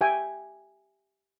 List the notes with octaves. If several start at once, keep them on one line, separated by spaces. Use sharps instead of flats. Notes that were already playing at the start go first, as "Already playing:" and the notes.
G4 E5 G5 G#5